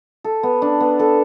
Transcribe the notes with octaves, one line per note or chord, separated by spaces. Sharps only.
A4
B3
D4
B3
A4